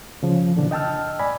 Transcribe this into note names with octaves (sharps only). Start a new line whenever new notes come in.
C#3 F3
A#2 D3 E3 D4 F4
D#5 G5 A5 E6 F6
D5 G#5 B5